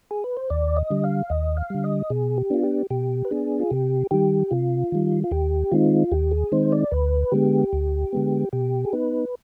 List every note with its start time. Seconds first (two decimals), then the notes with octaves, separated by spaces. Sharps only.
0.11 G#4
0.24 B4
0.37 C5
0.50 D#2 D5
0.77 D#5
0.90 D3 G3
1.04 F5
1.30 D#2 D#5
1.57 F5
1.70 D3 G3
1.84 D#5
2.10 B2 G#4
2.38 G4
2.50 B3 D4 F4
2.63 G4
2.90 B2 G4
3.25 B4
3.31 B3 D4 G#4
3.60 F4
3.70 C3 G4
4.11 D#3 G3 G4
4.51 C3 F4
4.92 D#3 G3
5.24 F4
5.31 D#2 G4
5.72 D#3 G#3 C4 D#4 F4
6.12 D#2 G4
6.31 G#4
6.52 D#3 G#3 C4 D#4 C5
6.72 D5
6.91 D2 B4
7.32 D3 G#3 B3 G4
7.73 D2
8.13 D3 G#3 B3
8.53 B2 G4
8.85 G#4
8.93 B3 D#4 B4